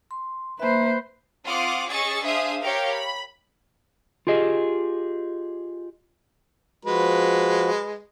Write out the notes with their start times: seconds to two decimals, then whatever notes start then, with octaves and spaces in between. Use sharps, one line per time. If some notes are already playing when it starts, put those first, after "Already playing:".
0.11 C6
0.60 A#3 B4 C5 E5
1.45 C4 F4 F#5 D6 D#6
1.89 C#4 G#4 D#5 C#6 E6 A6
2.23 D4 G#4 C5 E5 F5 D#6
2.61 G4 A#4 C#5 F5 G5
2.91 B5
4.27 F4 G4 G#4 D#5
6.85 F3 G#3 F#4 B4